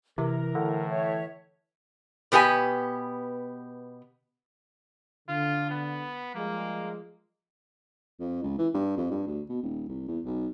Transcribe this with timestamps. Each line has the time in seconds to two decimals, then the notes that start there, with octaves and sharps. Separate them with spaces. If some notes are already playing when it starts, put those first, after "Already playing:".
0.18 C3 E3 A#4
0.55 A2 D3
0.89 C#5 E5
2.32 B2 B3 G4 A#4 G#5
5.29 D3 F4
5.70 B3
6.35 F3 G3 G#3 A#3
8.20 F2
8.43 C#2
8.59 E3
8.74 G2
8.97 F2
9.11 G2
9.27 D2
9.49 B2
9.63 D#1
9.88 C2
10.08 E2
10.25 B1